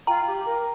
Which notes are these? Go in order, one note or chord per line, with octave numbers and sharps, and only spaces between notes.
F4 G5 A#5
G4
A#4